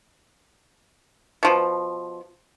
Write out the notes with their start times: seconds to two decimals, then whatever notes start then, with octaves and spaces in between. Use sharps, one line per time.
1.43 B2 F3